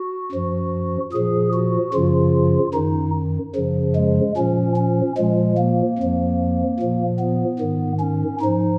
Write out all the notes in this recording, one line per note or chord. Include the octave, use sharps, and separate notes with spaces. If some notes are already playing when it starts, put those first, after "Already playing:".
Already playing: F#4
F#2 F3
A#2 F3 G#4
F#4
F#2 C#3 F3 F4
F#2 D#3 D#4
F#2 C#3 F3
G#3
A#2 F3 C#4
C#4
A#2 F3 G#3
A#3
F2 F3
A#2 F3
B3
G#2 D#3
C#4
G#2 F3 D#4